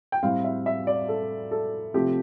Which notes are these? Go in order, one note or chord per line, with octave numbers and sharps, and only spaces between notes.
G5
A2 G3 C4 F5
E5
E5
D5
A4
A4
C3 F3 A3 C4 G4